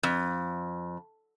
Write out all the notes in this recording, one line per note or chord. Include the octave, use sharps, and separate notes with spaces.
F2